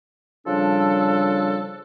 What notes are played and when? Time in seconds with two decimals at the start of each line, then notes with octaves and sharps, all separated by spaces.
0.46 C#3 F3 G3 D4 A4